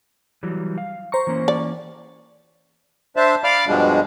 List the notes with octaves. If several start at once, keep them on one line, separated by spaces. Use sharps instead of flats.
E3 F#3 G3
F5
C5 A#5 C#6
E3 A#3 C#4
D5
D4 C5 E5 A5
D5 F5 B5 D6 F6
G2 B2 F3 G3 G#3 D4